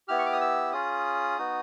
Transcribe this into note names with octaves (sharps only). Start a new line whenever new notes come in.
B3 E4 G4 F6
C#6
D6
D#6
E6
C#4 F4 G#4 D#6
B3 D#4 F#4